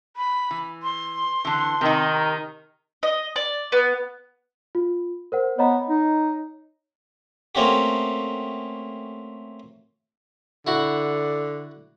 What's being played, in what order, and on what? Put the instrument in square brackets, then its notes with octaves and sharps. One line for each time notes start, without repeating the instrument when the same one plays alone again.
[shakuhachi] B5
[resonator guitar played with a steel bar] E3
[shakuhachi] C6
[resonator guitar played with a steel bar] D3 E3
[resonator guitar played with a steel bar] C3 D#4 [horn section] D#3
[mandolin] D#5
D5
B3
[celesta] F4
A#4 C5 F#5
[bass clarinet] B3 [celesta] C#5 D#5 A#5
[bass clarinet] D#4
[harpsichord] A3 A#3 C4 C#4 F#4 G4
[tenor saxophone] D3 [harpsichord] E4 F#4 F#5